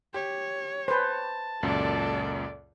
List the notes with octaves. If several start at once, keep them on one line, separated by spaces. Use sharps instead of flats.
G4 C#5
B4 C5 A5
C#2 F#2 A#2 A4 D5